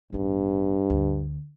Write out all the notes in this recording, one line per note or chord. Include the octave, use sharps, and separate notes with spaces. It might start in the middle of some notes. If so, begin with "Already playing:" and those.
A1 G2 B3
D2